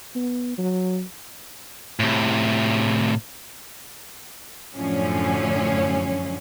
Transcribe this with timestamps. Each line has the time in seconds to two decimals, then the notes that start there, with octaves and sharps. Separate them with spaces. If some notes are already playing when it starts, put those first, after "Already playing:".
0.15 B3
0.58 F#3
2.00 A2 C3
4.75 F#2 A2 D3 F3 C#4